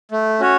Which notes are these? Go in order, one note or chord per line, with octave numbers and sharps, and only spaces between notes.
A3
C#4 F#4 C#5